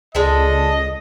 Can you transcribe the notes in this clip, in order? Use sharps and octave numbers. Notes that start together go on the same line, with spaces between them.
C#2 G#3 D4 A4 D#5